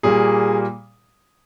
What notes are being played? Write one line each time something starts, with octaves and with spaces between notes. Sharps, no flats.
A#2 G3 A#3 G#4